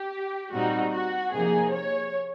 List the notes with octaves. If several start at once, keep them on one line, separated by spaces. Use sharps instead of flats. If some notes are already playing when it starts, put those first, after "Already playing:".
Already playing: G4
A#2 G3 C4 D#4 F#4
F#4
C3 F3 A#3 D#4 G#4
C#5